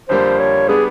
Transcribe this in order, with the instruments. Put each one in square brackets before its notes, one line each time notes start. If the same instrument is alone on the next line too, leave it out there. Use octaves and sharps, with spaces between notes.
[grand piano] F2 D3 G3 A#3 [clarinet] C5
[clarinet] C#5
[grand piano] G3 B3 D4 [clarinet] G#4